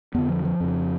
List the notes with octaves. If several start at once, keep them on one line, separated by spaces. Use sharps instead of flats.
F2 D3 B3
F3
F3
F2 C#3